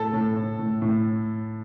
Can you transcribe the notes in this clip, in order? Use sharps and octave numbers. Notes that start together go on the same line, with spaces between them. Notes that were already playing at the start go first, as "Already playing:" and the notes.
Already playing: A2 A4 A5
A2
A2
A2
A2